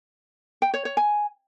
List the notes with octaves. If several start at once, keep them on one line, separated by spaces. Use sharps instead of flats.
G5
C#5
C#5
G#5